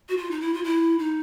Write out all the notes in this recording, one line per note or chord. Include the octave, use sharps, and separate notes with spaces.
F#4
F4
D#4
E4
F4
E4
D#4